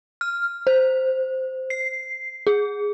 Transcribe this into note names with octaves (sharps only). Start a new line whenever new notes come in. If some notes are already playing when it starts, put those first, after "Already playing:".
F6
C5
C7
G#4